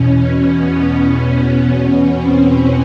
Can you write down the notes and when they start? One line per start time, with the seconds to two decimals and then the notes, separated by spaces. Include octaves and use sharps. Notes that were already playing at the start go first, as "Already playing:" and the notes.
Already playing: E2 B2 C#4
0.58 B3
2.16 C4